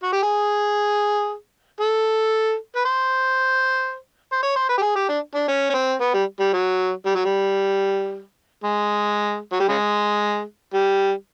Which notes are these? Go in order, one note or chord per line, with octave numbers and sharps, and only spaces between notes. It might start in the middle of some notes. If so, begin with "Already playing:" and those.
F#4
G4
G#4
A4
B4
C5
C5
C#5
C5
B4
G4
G#4
G4
D4
D4
C#4
C#4
C4
B3
G3
G3
F#3
G3
F#3
G3
G#3
F#3
G3
C#3 G#3
G3